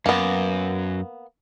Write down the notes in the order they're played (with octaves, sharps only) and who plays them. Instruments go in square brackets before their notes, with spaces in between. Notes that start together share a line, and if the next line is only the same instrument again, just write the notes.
[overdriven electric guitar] F#2 [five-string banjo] A#3 B3